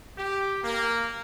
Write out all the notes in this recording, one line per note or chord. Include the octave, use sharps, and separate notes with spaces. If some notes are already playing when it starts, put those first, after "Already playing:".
G4
A#3